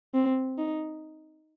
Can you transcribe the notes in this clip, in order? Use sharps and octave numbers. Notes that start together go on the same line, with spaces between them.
C4
D#4